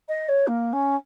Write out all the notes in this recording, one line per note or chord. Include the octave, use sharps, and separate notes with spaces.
D#5
C#5
A#3
C#4